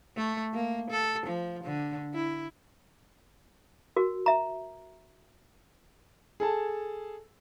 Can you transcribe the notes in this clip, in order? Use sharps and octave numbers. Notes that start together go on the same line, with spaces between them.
A3
A#3
A4
F3
D3
E4
F#4 A#4
E5 A#5
G#4 A4 A5